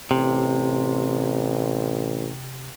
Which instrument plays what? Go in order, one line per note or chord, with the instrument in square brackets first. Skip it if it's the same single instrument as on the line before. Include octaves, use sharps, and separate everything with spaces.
[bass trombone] A1 [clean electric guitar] C3